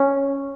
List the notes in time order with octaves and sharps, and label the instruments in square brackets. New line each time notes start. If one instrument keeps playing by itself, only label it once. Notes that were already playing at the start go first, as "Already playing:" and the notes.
Already playing: [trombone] C#4